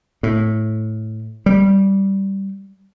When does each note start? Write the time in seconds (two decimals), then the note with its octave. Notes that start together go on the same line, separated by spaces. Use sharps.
0.23 A2
1.46 G3